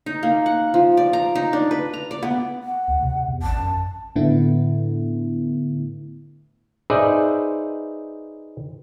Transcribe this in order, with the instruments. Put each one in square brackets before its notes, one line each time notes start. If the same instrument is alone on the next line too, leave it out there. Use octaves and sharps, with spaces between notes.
[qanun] D#4
A#3
F#5
F3
D5
A#5
D#4
D4
B4
A#5
D5
B3
[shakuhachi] F#5
[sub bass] D2
C3
E2
[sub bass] A1 [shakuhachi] A5
[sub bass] F#2
[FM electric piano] A2 D3 A3 B3 E4
[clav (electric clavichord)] D#4 G#4 B4 C5 D5 E5